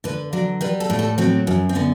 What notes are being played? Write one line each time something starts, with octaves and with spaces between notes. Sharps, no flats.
D3 B4
F#3 D5
G3 B4
A4
A2
A4
F#3 C4
F#2
C4
D3 B3